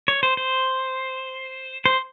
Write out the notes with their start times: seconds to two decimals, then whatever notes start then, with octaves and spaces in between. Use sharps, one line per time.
0.08 C#5
0.23 C5
0.37 C5
1.86 C5